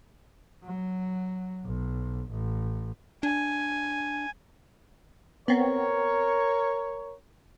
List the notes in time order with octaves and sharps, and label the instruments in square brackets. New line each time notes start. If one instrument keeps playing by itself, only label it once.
[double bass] F#3
B1
A1
[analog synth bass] D4 [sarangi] G#5
[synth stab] B3 C4 [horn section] A#4 C#5